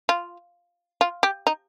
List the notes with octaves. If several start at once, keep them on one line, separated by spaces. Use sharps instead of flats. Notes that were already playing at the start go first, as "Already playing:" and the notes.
F4
F4
G4
D#4